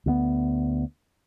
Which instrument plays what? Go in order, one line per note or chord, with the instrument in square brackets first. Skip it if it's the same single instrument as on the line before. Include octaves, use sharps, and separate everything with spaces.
[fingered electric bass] D2 G#3 B3